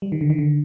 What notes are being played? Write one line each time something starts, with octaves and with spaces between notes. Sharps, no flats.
G3
D#3
D3
D#3
D3